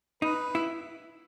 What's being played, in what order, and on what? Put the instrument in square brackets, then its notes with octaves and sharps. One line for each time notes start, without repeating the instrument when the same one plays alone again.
[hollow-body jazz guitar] D#4 [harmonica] B4
[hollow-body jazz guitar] E4